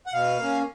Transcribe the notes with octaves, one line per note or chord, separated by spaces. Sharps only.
F#5
B2 F5
A#3 C#4